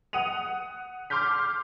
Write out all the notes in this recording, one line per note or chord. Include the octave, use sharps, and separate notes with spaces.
F#5 D#6 D#7 F7
C6 D6 F6 G6 B6